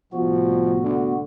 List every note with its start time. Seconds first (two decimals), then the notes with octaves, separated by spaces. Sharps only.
0.13 C2 A2 F3 B3 F#4
0.82 D3